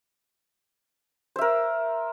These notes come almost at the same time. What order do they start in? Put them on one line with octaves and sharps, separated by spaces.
C5 E5 A#4